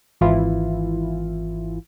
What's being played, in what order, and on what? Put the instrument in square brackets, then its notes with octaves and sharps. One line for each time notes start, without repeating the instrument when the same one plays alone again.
[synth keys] G#1 E3 E4 F4